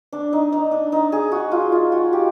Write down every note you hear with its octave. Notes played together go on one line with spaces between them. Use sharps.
D4
D#4
D#4
D4
D#4
G#4
F#4
F4
F4
F#4
G4